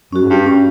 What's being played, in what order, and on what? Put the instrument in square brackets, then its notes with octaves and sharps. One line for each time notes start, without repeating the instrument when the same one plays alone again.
[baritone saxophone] F#2 [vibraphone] C#4 F#4
[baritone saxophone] G#2
G2
[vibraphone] C#4